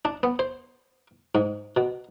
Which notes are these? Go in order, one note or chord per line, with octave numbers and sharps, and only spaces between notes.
D4
B3
C5
G#2
B2